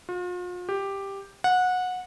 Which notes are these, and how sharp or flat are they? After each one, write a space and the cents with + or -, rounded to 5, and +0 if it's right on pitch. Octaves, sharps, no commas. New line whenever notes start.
F4 +40
G4 +5
F#5 -20